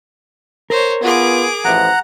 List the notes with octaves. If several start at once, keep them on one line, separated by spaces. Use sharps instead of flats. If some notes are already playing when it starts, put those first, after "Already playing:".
A#4 C5 C#5
B3 F4 G#4 D6
A1 E3 F3 F#5 A#5